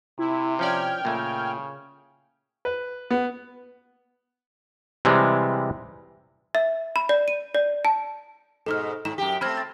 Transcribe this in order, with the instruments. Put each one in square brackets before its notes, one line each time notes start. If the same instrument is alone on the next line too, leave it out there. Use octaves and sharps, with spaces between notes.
[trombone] C3 [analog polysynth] E4
[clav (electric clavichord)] F3 C#4 D5 [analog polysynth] G5 F6 G#6
[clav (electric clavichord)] A#2 A3 [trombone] C#3
[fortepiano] B4
B3
[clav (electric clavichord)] C3 E3 G3 G#3
[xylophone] E5
B5
D5
D#7
D5
A5
[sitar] G#2 B2 [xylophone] A4 F6
[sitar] G#2 [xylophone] E7
[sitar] F#2 G4
[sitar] A3 C4 [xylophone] B5 F6 G#6
[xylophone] A6